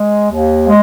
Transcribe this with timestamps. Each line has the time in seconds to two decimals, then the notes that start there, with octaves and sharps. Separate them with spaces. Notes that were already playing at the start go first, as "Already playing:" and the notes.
Already playing: G#3
0.30 D#2
0.67 G#3